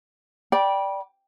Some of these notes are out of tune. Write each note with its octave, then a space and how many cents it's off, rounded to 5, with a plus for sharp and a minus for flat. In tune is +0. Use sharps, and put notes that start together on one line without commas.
D5 -5 G5 +0 B5 -30